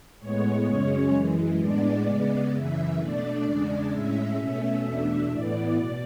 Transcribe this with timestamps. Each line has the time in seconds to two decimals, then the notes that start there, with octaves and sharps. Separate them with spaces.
0.20 A2 G#3 B3 C#5
0.66 F#2 C#3 G#3 C#4
1.12 F#2 E3 G#3
1.58 A2 G#3 B3 D4 D5
2.05 C#3 G#3 B3
2.52 F#2 C#3 E3 E5
2.97 B2 A3 D4 D5
3.43 E2 C#3 G#3 D4
3.90 A2 G#3 C#4 E5
4.36 B2 A3 C#4 E5
4.82 E2 B2 A3 D4
5.29 A2 E3 B3 D5
5.75 B2